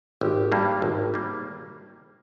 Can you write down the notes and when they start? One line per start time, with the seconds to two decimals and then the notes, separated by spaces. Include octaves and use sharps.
0.21 G#1 G4
0.52 G2 G3 A#3
0.82 G#1
1.14 G3 A#3